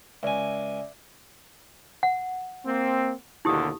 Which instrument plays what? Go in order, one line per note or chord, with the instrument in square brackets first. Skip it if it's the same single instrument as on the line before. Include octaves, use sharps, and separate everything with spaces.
[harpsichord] C#2 G#5 [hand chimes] D5 E5
[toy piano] F#5
[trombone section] A#3 C4
[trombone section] D#2 B2 D3 [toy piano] E4 G4 D#6